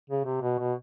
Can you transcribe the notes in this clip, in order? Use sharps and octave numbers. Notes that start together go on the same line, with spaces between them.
C#3
C3
B2
B2